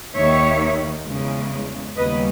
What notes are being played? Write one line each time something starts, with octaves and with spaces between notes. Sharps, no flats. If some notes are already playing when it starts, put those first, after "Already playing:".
D#2 D#3 A#3 C#5 E5
E2 C#3 G#3
D#2 C#3 G3 B3 B4 D#5